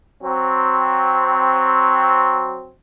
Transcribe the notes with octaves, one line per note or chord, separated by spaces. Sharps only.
F#3 C4